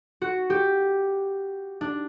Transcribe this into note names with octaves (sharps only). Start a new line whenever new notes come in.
F#4
G4
D4